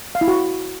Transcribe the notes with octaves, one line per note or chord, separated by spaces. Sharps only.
F5
E4
F#4